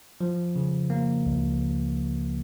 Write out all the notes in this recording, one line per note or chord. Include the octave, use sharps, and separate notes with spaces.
F3
C#3
A#3
C#2